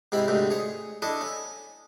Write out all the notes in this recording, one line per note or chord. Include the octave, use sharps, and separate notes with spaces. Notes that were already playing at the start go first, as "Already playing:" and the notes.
G#2 C3 E4 B5
D2 G#2 C3
G#4 C#5
D4 E4 A4 D#5
C#4